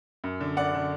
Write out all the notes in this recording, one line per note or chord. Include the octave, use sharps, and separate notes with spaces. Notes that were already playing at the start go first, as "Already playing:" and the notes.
F#2
D3
F#2 D5 F#5
D3